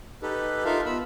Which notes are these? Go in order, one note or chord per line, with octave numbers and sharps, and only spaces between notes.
D#4 G4 A4 B4
D#4 F4 A4 A#4 E5 F5
B3 F4 B5 E6